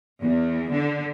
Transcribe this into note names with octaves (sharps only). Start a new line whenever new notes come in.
E2
D3